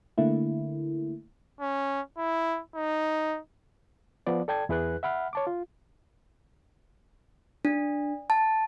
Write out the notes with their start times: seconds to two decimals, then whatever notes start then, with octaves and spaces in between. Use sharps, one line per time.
0.18 D3 A3 A#3 E4
1.60 C#4
2.18 E4
2.75 D#4
4.27 F3 B3 D5
4.48 A4 D5 G5 A5 G#6
4.69 E2 E4 G#4 B4 F#6
5.03 E5 F#5 B5 F6
5.33 C#5 A5 D6
5.47 F4
7.65 D4
8.30 A5